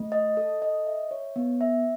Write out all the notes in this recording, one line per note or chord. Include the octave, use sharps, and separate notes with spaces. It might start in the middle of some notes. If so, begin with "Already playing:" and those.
Already playing: A3
D#5
A4
D#5
E5
C#5
B3
E5